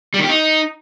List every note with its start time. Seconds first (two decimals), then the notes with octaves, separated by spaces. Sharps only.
0.14 G3
0.19 D#3
0.24 G4
0.29 D#4